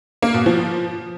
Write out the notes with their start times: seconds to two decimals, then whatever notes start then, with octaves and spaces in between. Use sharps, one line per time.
0.22 A#3
0.34 B2
0.46 F3